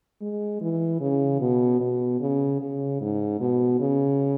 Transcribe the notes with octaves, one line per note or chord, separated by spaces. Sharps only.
G#3
E3
C#3
B2
B2
C#3
C#3
G#2
B2
C#3